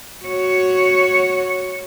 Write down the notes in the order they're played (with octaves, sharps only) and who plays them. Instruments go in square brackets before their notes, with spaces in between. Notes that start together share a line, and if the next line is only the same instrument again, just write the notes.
[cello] F#4 C#5